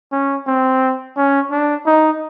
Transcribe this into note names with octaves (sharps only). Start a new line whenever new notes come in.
C#4
C4
C#4
D4
D#4